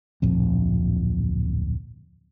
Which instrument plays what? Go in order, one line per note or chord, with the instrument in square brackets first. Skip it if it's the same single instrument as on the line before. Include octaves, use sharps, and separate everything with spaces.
[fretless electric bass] D1 A#1 F2